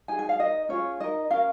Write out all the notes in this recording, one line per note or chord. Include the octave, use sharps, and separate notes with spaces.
D#4 G#4 G#5
G#5
F5
D#4 A#4 D#5
C#4 F4 G#4 C#5
D#4 A#4 D#5
C#4 A#4 F5